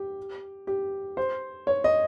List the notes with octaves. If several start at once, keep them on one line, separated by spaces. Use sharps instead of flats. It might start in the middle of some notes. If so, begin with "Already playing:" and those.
Already playing: G4
G4
C5
C#5
D#5